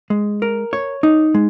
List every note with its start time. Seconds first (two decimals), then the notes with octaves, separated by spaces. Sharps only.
0.10 G#3
0.42 A#4
0.73 C#5
1.03 D#4
1.34 G#3